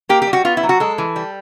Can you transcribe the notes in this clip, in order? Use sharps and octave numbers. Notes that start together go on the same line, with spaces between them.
A#3 G4
G4
G3
F#4
B3 F4
E4
F#3
F#4
G#3 A4
E3
G3